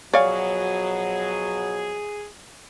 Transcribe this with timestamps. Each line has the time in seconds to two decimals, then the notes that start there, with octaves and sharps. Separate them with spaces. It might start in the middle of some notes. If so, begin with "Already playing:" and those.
0.14 B2 F3 F#3 G#4 C#5 D5 F5 G#5